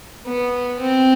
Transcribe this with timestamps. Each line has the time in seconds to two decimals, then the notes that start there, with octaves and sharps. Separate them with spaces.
0.26 B3
0.80 C4